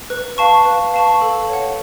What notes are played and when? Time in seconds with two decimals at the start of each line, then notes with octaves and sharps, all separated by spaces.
0.10 B4
0.38 F5 A5 C#6
0.65 B4
0.94 F5 A5 C#6
1.21 A4
1.49 C#5 F#5